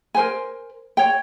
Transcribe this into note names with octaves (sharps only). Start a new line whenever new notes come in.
A#4 C5 G#5
C#5 G5